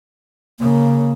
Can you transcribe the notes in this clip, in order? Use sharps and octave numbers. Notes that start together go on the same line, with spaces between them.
C#3 A#3